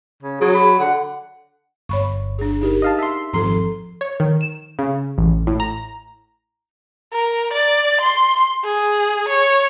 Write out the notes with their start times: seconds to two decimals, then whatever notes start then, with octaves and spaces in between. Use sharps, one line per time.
0.23 C#3
0.41 F#3 G#4
0.54 B5
0.79 D3 F#5
1.89 G1 C#5 B5 C#6
2.39 D4 G#4
2.61 D#4 G4 A#4
2.82 D#5 F5 A5
2.99 E5 A5 C6
3.33 G#1 F2 F3 A4 A#5 C6
4.01 C#5
4.20 D#3
4.41 E7
4.79 C#3
5.18 A1
5.47 A2
5.60 A#5
7.13 A#4
7.53 D5
8.01 C6
8.65 G#4
9.28 C#5